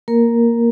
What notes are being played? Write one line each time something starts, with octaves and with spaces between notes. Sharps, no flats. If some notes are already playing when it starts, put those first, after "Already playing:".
A#3 A#4